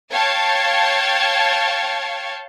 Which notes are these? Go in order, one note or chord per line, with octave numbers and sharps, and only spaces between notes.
C#5 F5 G5 A5 G#6